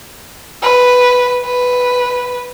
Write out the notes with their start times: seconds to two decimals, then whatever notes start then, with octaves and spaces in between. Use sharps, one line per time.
0.62 B4
1.45 B4